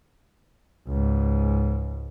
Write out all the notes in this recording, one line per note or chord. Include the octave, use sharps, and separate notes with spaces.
C#2 G#2